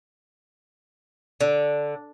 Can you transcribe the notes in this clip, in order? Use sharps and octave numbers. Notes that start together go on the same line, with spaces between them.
D3